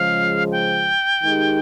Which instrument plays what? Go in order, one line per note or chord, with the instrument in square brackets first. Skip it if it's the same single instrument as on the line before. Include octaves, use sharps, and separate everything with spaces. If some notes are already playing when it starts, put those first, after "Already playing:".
Already playing: [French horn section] C#3 F3 G#3 [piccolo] F5
[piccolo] G5
[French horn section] D#3 G#3 D#4 G4